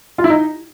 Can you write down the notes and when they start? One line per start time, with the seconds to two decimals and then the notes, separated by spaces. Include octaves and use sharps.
0.18 F4
0.24 E4
0.30 D#4